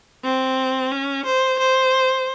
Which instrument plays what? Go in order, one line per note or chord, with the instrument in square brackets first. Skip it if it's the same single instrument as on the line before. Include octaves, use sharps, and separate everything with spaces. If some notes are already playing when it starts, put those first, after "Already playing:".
[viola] C4
C#4
C5
C5